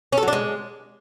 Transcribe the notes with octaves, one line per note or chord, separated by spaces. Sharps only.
C#4
A4
F#3
D4
G#3